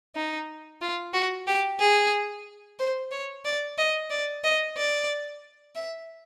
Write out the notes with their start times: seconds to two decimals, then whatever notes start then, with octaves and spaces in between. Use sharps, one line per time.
0.16 D#4
0.81 F4
1.14 F#4
1.47 G4
1.80 G#4
2.79 C5
3.11 C#5
3.45 D5
3.78 D#5
4.10 D5
4.44 D#5
4.77 D5
5.75 E5